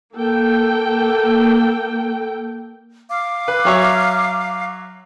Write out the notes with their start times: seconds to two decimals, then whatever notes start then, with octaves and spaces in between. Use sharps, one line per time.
0.15 A#3 A4 G5
3.09 F5 D6
3.48 B4
3.65 F#3 C#5 E5